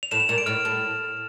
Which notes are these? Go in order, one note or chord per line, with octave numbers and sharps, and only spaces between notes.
F7
A2 E7
F7
A#2 E7
D7
A2 F6
A2